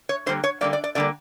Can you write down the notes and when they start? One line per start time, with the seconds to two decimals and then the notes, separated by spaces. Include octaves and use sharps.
0.09 C#5
0.26 D3 G3 A#3 C5
0.44 C#5
0.61 D3 G3 A#3 D5
0.73 D5
0.84 D5
0.95 D3 G3 A#3 D5